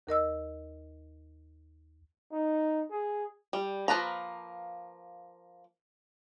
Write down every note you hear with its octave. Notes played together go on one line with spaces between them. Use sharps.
D#2 A#4 D#5 E6
D#4
G#4
G3
F3 A#3 B4 A5 A#5